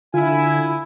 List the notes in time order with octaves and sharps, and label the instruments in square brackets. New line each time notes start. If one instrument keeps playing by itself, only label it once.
[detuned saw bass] D3 [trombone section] E4 [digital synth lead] F4 [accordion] G#5